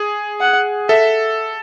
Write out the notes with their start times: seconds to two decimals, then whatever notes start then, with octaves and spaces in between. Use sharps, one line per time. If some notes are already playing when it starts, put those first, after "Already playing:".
Already playing: G#4
0.41 F#5
0.89 A4 E5